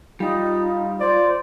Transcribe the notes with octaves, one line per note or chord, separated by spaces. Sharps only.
G3 D#4 F4 G4
C5 D5